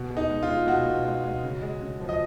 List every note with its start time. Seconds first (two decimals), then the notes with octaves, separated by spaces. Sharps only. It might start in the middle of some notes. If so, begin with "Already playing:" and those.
Already playing: B2
0.10 B2
0.17 D#4
0.29 G#3
0.43 F4
0.48 G#3
0.67 B2 F#4
0.86 B2
1.05 G#3
1.24 G#3
1.43 C#3
1.62 G#3
1.81 C#3
2.00 F3
2.09 D#5